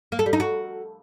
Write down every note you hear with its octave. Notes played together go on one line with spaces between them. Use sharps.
A#3
A4
G3
D#4
F#4